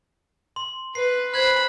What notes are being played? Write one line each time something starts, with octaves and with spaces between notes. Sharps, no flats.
C6
B4 C7
C5 B5 F#6 G#6